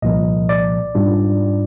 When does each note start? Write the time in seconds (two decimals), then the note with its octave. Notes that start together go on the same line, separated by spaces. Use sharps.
0.02 C2 A#2 F3 A#3 D#5
0.49 D5
0.95 G#2 G3 D4 F4